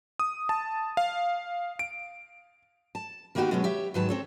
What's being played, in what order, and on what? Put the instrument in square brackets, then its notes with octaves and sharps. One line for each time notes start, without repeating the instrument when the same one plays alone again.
[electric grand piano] D#6
A5
F5
D7
[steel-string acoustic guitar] A5
D#3 A#3 B3 D#4 F#4 G4
B2 F#3 G#3 B3 C#4
G4 C#5 E5
G#2 D#3 F#3 B4 A5
C4 A4 C#5